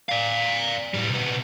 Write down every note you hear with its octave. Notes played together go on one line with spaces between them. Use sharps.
D5 F5
A2 G3
C3 B3